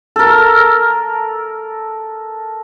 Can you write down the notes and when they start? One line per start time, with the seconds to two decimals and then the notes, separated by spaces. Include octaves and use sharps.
0.16 A4 A#4